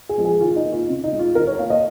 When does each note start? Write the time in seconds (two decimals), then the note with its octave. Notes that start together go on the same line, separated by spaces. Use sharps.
0.09 G#4
0.18 F3 G#3
0.25 G#4
0.41 D#3 F4
0.56 D#4
0.65 A#3
0.72 F4
0.89 C#3
1.04 D#4
1.12 G#3
1.19 F4
1.35 D#3 A#4
1.47 C#5
1.59 A#3 F5
1.70 D#5